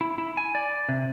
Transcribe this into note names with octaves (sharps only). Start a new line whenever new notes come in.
E4
E4
G#5
D5
C3